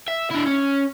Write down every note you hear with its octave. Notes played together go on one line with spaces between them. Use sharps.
E5
D4 E4
C#4